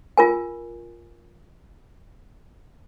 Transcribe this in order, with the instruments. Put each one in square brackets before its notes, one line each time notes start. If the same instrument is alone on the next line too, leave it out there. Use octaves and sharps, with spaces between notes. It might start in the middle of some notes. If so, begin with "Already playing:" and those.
[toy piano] F4 A#4 G#5